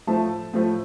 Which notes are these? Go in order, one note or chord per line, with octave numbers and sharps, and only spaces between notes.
A2 F3 A3 A5
A2 F3 A3